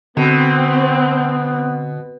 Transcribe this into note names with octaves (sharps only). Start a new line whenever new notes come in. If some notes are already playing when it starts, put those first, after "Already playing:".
B2 D3 B3 C4